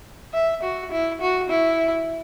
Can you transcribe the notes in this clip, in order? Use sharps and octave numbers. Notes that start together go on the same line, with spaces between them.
E5
F#4
E4
F#4
E4